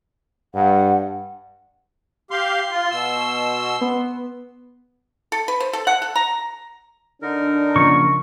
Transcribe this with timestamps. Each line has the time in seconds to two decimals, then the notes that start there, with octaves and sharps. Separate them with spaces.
0.54 G2 F#5
2.31 G4 F5 C6
2.71 F4
2.91 B2 E6
3.81 B3
5.32 A4
5.48 B4
5.60 C5
5.73 A4
5.87 F#5
6.02 A4
6.16 A#5
7.22 D3 D4 D#4 A#4
7.76 C#3 F3 A#3 C#6